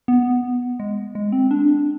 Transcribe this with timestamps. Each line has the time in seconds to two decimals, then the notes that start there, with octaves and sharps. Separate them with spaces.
0.08 B3
0.80 G#3
1.15 G#3
1.32 C4
1.51 D4